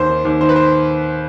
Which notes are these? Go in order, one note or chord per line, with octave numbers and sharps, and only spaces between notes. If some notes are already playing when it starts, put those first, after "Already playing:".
Already playing: D#2 C5
D#3
D#2
D#3 C5
B4
C5